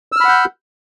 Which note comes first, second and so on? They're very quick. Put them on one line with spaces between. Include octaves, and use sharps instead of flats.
E6 F6 B5 F#5 G6